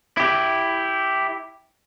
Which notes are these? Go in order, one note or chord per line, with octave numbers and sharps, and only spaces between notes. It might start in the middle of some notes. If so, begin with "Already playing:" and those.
E4 G4